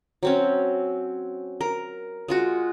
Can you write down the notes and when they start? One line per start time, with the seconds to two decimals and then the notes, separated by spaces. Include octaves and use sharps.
0.23 F#3 C4 C#4
1.61 A#4
2.28 G#3 F4 F#4